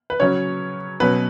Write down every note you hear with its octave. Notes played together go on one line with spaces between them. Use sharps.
B4
C#3 F#3 C#4 C#5
B2 F#3 C#4 B4